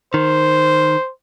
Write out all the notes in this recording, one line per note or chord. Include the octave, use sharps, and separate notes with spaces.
D#3 C5